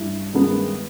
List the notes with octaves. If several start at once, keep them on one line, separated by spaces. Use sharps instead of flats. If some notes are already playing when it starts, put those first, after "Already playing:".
Already playing: G2 E4
G2 D#3 G#3 B3